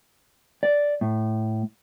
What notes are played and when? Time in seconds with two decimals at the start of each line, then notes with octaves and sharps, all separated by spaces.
0.63 D5
1.01 A2